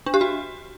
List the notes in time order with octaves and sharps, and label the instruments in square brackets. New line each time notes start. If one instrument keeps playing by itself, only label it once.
[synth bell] D4
G4
F#4